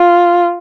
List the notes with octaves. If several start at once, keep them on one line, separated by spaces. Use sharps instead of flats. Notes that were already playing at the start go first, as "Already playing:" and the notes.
Already playing: F4